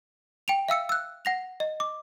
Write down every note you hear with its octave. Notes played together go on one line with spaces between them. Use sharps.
G5 D7 F7
E5 F5 E6 C#7
E6 F#6
F#5 A#6 F7
D#5
D6